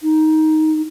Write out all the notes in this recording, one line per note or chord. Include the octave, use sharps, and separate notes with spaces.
D#4